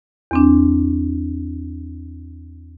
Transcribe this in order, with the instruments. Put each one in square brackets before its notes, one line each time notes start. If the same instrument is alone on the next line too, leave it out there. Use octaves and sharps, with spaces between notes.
[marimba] E2 C4 D4